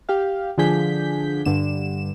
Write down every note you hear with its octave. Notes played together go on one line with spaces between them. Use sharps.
G4 F5
D3 F3 D4 G#4 G6 B6
G2 D3 E7